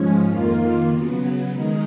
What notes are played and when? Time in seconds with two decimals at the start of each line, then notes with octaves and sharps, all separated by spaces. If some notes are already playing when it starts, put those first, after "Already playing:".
Already playing: G#2 F3 G#3 C#4
0.27 F2 D#3 A#3 F4
0.89 C#3 F#3 B3
1.50 D#3 G#3 D#4